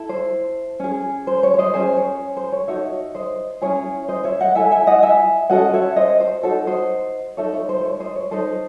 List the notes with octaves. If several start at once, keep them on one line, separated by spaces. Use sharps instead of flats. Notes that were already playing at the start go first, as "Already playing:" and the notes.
Already playing: E4 A4
C5
C#4 G#4
C5
C#5
C#5
C5 D#5
C#4 G#4 C5 D#5
C#5
C5
C#5
D#4 F#4 A4 C#5 E5
C5 D#5
C#4 E4 G#4 C#5
C5 D#5
C#5 E5
D#5 F#5
E4 A4 E5 G#5
E5 G#5
D#5 F#5
E5 G#5
C#4 F#4 A4 D#5 F#5
C#5 E5
C5 D#5
C5
D#4 F#4 A4 C#5
C5 D#5
D#4 A4 C#5 E5
C#5
C5
C5
C#5
C5 D#5
C#5
D#4 A4 C5 D#5